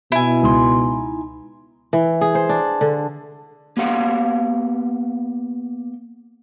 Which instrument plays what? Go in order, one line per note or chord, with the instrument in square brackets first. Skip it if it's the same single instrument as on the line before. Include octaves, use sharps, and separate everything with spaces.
[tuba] B2 [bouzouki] E4 G#5
[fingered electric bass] C#2 G#3 [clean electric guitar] D#4 C6
[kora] E3
G#4
C5
D4
D3
[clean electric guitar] A#3 B3 G4 F5 F#5